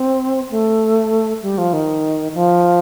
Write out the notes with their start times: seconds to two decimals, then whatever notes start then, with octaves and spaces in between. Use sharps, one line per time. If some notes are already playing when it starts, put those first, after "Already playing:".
Already playing: C4
0.51 A3
1.42 G3
1.58 F3
1.73 D#3
2.34 F3